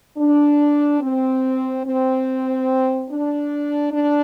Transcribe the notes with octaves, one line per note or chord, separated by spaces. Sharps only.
D4
C4
C4
D4
D4